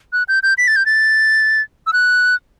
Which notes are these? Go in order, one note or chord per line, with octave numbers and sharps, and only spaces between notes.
F#6
G6
G6
B6
A6
G6
A6
E6
F#6